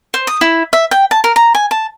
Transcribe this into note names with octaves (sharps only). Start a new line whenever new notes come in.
C5
D#6
E4
E5
G5
A5
A#4
A#5
G#5
A5